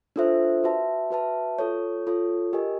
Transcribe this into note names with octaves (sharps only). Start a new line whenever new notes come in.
D4 F4 A4 C5 E5
F#4 B4 E5 A5
F#4 B4 E5 A5
F4 A4 C#5
F4 A4 C#5
G4 A#4 D#5 G#5